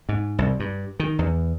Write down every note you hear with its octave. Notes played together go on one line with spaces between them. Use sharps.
G#2
C2
G2
D#3
E2